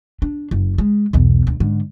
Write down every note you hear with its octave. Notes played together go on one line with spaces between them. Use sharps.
D4
F#1
G#3
B1 E2
D2
G#2 D3